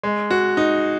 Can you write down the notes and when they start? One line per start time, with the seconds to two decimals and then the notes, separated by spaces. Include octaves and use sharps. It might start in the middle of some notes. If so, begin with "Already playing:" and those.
0.03 G#3
0.31 F#4
0.57 D#4